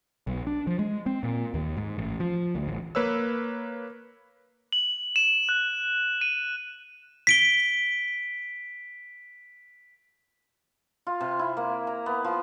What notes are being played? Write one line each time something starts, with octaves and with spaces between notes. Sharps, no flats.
B1
D4
F3
G#3
C4
A#2
D#2
G#2
A1
F3
D2
A1
A#3 B4 C#5 E6
F#7
E7
F#6
D#7
B6 D7 G7
F4
C3
E4
A#3
A#5
B3
F3